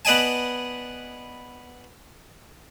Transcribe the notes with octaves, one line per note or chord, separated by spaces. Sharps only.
B3 B4 D5 D#5 G#5 A5